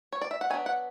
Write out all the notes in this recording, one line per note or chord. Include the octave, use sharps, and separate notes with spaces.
C#5
D5
E5
F#5
F#3 B3 D4 G#5
F#5